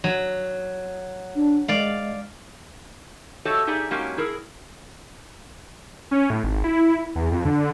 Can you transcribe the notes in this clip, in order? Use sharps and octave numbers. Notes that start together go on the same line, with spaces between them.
F#3
D4
G#3 D5 F5
F#4 G4 A4 C#5 D#5 E5
D#4 G4 G#4 D5 E5
F#3 G#3 A#3 C#4 D#4 G4
E4 G#4 A#4
C#4
A2
G#1
E4
E2
F2
D3